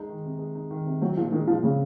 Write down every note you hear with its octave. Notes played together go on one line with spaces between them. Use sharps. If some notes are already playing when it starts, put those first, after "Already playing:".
Already playing: G#3 D#4
D#3
C3
G#3
D#4
D#3
C3
F#3 C4
A#2 F3
D#3 G#3
A#2 F3
C#3 C4